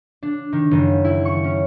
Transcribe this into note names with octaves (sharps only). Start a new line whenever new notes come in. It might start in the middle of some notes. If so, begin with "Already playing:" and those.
D4
D#3
F#1
E4
C#6
C#4